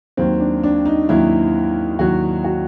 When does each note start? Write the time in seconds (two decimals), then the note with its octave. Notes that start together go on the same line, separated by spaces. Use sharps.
0.17 D#2 D#3 F#3 C4
0.40 D4
0.64 D4
0.85 D#4
1.09 D#2 D#3 F#3 E4
1.99 D#2 D#3 F#3 F#4
2.44 F#4